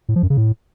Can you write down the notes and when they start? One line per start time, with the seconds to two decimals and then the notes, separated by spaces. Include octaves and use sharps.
0.09 A2
0.16 F3
0.23 F#2
0.30 C#3
0.37 A2